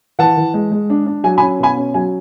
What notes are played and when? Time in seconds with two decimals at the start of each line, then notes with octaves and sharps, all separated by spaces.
0.19 E3 F#5 A5
0.37 E3
0.54 G#3
0.72 G#3
0.90 D4
1.06 D4
1.24 F#3 G#5
1.38 G#5 B5
1.41 C#4
1.59 B2 G#5 B5
1.77 C#4
1.94 F#3 G#5